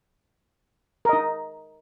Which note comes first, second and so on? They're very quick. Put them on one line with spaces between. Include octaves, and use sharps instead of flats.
A#4 D#5 D#4